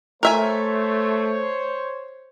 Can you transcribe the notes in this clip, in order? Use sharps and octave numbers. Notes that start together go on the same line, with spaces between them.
A3 A#4 C5 C#5 E5 G#5